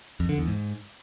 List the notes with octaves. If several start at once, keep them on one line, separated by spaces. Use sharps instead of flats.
F2
D3
E2
G#2